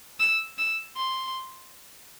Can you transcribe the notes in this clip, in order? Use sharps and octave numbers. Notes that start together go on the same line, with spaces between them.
E6
E6
C6